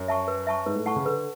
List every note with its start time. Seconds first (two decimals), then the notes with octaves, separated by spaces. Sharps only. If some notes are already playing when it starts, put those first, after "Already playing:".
Already playing: F#2
0.08 E5 A5 C#6
0.28 B4
0.47 E5 A5 C#6
0.66 G#2 B4
0.76 A2
0.86 A2 F#5 A5 C#6
0.96 C#3
1.05 D3 B4